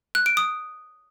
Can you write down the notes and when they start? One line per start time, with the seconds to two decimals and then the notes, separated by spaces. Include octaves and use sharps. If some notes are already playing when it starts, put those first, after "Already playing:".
0.15 F#6
0.26 D7
0.37 D#6